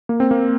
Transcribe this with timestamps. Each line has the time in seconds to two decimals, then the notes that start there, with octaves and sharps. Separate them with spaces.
0.09 A#3
0.20 C4
0.31 A#3